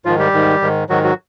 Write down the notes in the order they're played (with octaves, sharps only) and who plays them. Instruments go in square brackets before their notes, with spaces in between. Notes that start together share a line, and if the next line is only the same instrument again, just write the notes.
[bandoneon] G#2 D#3 F3 F4
G3 G4
G#2 D#3
G#2 D#3
G#2 D#3 F#3 F#4
F#3 F#4